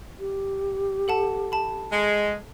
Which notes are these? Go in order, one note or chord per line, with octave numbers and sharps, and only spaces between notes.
G4
A4 F#5 A5
A5 B5
G#3